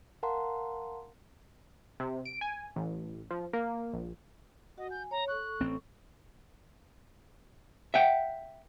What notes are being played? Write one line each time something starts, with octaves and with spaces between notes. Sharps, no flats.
A#4 F5 F#5 A5 A#5 C6
C3
D7
G#5
A1
F3
A#3
A#1
F#4 D#5 F#5
G#5 G6
C#5 A#5
A4 C#6 F#6
A1 C4
E5 F#5 G5